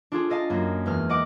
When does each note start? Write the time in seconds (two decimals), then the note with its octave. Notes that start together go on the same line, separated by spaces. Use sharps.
0.12 D4 F4 G#4 A4
0.30 A4 D#5 F5 A5
0.50 F#2 A#3
0.86 E2 G#3 F6
1.09 D#5 F#5 D6